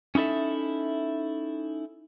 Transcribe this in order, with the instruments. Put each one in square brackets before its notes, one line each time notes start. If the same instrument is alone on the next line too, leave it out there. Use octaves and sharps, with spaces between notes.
[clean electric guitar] C#4 D#4 E4 A4 E5